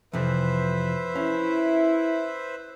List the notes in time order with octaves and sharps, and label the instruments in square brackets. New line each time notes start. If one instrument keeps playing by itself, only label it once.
[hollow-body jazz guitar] F2 C3 E3 [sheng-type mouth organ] B4 C5 E5
[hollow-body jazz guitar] C#4 [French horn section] E4